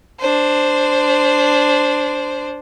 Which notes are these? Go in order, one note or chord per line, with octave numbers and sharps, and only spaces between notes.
D4 C5